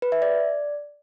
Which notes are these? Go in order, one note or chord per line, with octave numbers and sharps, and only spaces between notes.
B4
E5
D5